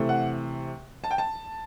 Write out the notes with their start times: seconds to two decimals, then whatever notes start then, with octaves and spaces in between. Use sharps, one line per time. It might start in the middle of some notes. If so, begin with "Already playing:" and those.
Already playing: C3 E3 A3
0.09 F#5
1.04 A5
1.11 G5
1.18 A5